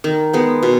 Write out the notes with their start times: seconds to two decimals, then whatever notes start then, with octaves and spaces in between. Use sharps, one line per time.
0.04 D#3
0.33 G#3 B3
0.63 B2